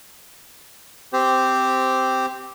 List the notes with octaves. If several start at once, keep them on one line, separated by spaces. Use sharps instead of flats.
C4 G4 C5